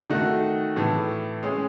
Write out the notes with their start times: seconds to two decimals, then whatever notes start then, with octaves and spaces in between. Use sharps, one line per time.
0.10 D#3 A3 D#4 F#4
0.76 A2 E3 A3
1.43 G#3 C#4 G#4